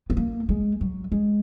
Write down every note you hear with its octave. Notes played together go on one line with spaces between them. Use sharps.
B3
A#3
G#3
F#3
G#3